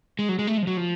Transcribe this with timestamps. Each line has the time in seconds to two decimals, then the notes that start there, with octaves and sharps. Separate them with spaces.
0.19 G#3
0.29 F#3
0.39 G#3
0.47 A3
0.57 G#3
0.63 F3
0.67 F#3
0.77 F3